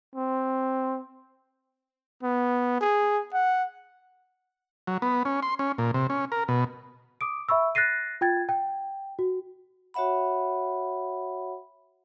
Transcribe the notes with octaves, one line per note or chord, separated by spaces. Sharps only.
C4
B3
G#4
F#5
F#3
B3
C#4
C6
C#4
A#2
C3
C#4
A#4
B2
D6 D#6 D7
E5 B5 C#6 E6
F#6 A6 A#6 C7 D#7
F4 G5 G#6 A6
G5
F#4
F#4 C#5 E5 F#5 B5